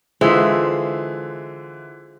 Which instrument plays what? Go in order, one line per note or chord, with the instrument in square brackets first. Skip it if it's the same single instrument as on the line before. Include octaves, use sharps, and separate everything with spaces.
[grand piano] D3 E3 [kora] G#3 [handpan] F4 C5 E5